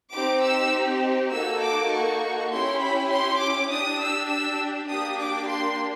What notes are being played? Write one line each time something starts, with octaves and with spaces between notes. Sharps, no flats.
C4 D#4 G4 D6
E6
A#3 D#4 F#4 A4 E6
D6
C#6
C#4 E4 G4 C6
B5
C6
D6
D4 G4 D#6
E6
E6
A#3 D4 G4 D#6
D6
C6